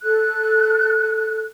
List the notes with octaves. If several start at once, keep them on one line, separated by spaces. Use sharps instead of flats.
A4 F#6